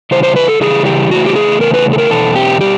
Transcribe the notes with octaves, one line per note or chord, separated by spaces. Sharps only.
C#3 E3 G3 C5
C5
B4
A4
C#3 E3 G3 G#4
G4
C#3 E3 A3 F#4
G4
G#4
C#3 E3 A3 A#4
B4
A4
A#4
E2 B2 A4
G4
B2 G3 G4